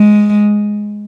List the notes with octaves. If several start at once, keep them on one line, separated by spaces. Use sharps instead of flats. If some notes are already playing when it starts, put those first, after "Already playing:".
Already playing: G#3